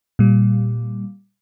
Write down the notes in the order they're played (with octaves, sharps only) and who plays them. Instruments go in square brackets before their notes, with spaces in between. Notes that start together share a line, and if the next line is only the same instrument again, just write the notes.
[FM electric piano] A#2 G3